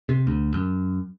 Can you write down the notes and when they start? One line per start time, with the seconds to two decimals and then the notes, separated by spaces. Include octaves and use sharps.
0.09 C3
0.27 D2
0.54 F#2